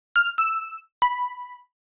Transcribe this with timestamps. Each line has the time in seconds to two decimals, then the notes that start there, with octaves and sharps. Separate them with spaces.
0.16 F6
0.38 E6
1.02 B5